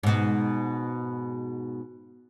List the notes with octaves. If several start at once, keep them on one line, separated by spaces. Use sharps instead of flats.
G#2 B2